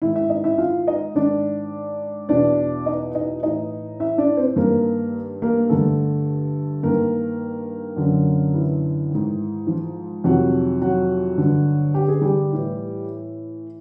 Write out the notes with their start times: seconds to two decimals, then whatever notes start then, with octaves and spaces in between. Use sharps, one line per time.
0.02 G#2 D#3 E4 E5
0.16 E4 E5
0.30 D#4 D#5
0.44 E4 E5
0.58 F4 F5
0.87 D#4 D#5
1.15 G#2 D#3 D4 D5
2.29 E2 B2 D4 D5
2.86 D#4 D#5
3.14 D#4 D#5
3.42 A2 E3 D#4 D#5
4.00 E4 E5
4.18 D4 D5
4.37 C4 C5
4.56 G2 D#3 A#3 A#4
5.42 A#3 A#4
5.69 G2 D3 A3 A4
6.83 G2 D#3 A#3 A#4
7.97 F#2 D3
8.54 E3 E4
9.11 G#2 D#3
9.67 F3 F4
10.24 F2 C3 D#3 F#3 F#4
10.82 F#3 F#4
11.38 G2 D3
11.94 G4
12.08 G#4
12.21 G3 G4
12.52 A2 E3